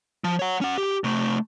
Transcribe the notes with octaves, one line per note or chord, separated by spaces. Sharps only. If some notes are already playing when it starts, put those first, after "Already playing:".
F3
C#5 F#5
C#4 F#5
G4
C3 A3